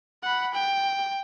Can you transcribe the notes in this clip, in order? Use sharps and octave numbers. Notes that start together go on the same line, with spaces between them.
F#5 B5
G5